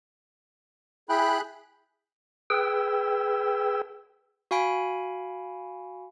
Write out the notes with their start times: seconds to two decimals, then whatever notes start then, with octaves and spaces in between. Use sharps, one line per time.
1.09 E4 G#4 G5 B5 F#6
2.50 G#4 B4 G5 E6
4.51 F#4 F5 G#5 B5 D7